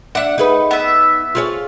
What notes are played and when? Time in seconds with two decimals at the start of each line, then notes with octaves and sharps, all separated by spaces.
0.15 D4 E5 F#5
0.38 D#4 G#4 B4
0.71 B3 E5
1.35 F4 G#4 C#5